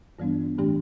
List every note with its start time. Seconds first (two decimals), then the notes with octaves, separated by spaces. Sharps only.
0.19 G2 E3 G3 B3 D4
0.58 A2 E3 A3 D4 G4